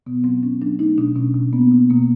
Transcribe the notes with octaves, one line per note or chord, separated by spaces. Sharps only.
B2 B3
F#3 C4
F#3 C#4
F#3 D4
A3 D#4
B2 D4
B2 C#4
B2
A#3 B3
B2
B2 A#3